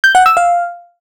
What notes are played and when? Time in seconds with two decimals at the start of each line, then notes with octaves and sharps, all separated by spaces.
0.04 G6
0.15 F#5
0.26 E6
0.37 F5